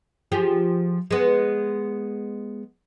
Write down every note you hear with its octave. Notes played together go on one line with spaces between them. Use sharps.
F3 G4 G#4
G#3 B3